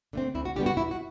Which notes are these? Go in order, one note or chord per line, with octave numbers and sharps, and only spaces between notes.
D3 A3 C4
D2 E4
F#4
D3 G3 B3 G4
F#4
E2 E4
F#4